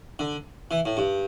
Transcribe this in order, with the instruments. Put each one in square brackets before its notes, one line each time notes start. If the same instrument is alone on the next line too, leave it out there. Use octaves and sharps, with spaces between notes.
[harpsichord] D3
E3
A2
G2